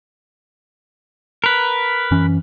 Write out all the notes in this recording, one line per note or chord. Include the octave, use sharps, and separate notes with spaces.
A#4 B4
F#2 E3 C#4